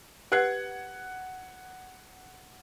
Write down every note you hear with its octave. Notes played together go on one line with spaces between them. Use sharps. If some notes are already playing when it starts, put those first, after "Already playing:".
G4 B4 F#5 F#6 G#6 C7